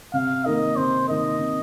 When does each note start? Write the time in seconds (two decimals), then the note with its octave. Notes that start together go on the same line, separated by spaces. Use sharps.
0.14 C3 F5
0.45 D#3 A#3 D#4 A#4 D#5
0.76 C3 C5
1.08 D#3 A#3 D#4 A#4 D#5
1.39 C3